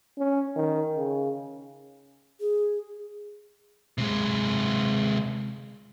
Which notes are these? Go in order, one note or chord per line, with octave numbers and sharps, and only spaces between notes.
C#4
D#3
C#3
G#4
C3 G#3